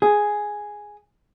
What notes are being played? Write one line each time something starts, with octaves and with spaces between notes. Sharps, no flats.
G#4